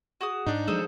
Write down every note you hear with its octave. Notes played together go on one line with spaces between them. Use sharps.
F#4 G#4 D#6
G#2 D4 D#4
F3 F#3 G#3 G#4 A4 C5